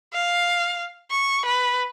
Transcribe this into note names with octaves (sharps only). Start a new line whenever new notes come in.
F5
C#6
B4